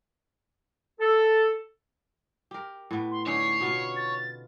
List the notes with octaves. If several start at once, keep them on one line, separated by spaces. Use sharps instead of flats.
A4
G4 A#4
A2 B3
C6
D3 C#4 D#4 C#5 C7
B2 B3 F4
A6